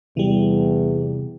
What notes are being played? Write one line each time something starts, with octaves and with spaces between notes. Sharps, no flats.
E2 C3 E3 G3